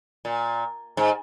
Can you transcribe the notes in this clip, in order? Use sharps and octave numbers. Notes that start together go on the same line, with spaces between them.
A#2
G#2